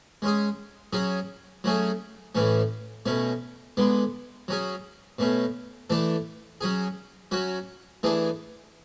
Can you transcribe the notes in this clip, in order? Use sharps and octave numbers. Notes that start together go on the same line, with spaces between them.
G#3 C#4 G#4
F#3 C#4 G#4
F#3 A3 C#4 G#4
A2 E3 A3 C#4
B2 A3 C#4
D3 G#3 B3
F#3 C#4 G#4
B2 A3 C#4
E3 A3 D4 A4
F#3 C#4 G#4
F#3 C#4 F#4
E3 A3 D4 G#4